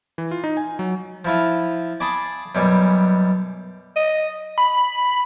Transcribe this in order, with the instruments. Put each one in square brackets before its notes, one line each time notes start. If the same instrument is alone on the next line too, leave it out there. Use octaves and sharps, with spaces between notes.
[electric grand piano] E3
F4
D#4
G#5
F#3
[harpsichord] F3 E4 F4
D5 G#5 A5 B5 C6 D#6
F#2 B2 G3 G#5
[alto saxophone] D#5
[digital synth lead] B5